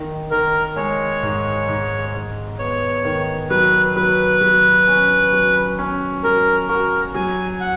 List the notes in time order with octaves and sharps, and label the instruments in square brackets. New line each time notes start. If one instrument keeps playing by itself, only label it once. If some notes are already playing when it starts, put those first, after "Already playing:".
Already playing: [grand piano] D#3
[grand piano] D#3 [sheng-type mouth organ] A#4
[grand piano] G#3 [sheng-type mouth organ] C#5
[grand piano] G#2
G#2
G#2
[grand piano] B3 [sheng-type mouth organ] C#5
[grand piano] D#3
[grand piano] F#3 [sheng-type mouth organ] B4
[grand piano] F#3 [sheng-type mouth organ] B4
[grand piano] F#3
C#4
F#3
C#4
[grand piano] F#3 [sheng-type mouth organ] A#4
[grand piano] F#4 [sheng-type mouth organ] A#4
[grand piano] F#3 [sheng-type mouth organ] G#5
[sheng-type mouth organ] F#5